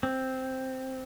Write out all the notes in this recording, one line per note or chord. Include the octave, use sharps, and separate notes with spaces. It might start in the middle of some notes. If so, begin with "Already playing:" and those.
C4